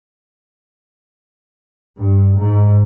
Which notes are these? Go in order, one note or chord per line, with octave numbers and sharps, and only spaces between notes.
G2
G#2